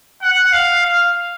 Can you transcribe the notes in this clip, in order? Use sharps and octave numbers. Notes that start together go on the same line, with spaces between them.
F#5
F5
F5